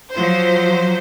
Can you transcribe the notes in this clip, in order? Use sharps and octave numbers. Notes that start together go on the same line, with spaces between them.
F3 F#3 C5